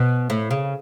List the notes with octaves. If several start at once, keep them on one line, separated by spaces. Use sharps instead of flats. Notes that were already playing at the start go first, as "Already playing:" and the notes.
Already playing: B2
A2
C#3